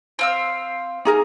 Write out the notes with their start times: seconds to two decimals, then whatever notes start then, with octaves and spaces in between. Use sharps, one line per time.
0.19 C4 F5 E6
1.05 D#4 G#4 A#4